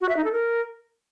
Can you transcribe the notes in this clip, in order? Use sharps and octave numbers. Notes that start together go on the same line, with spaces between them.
F#4
E5
D#4
A4
A#4